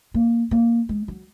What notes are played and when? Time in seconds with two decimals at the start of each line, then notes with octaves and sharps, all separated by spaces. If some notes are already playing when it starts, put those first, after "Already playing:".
0.14 A#3
0.51 A#3
0.89 G#3
1.08 F#3